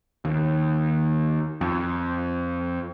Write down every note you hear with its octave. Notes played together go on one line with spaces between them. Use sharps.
D#2
F2